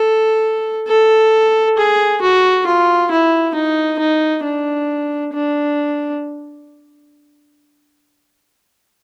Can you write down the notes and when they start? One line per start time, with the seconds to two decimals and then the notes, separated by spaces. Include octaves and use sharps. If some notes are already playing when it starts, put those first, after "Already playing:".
Already playing: A4
0.88 A4
1.77 G#4
2.21 F#4
2.66 F4
3.11 E4
3.55 D#4
3.99 D#4
4.44 D4
5.33 D4